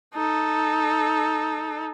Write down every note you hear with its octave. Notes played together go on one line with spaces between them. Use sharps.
D#4 A4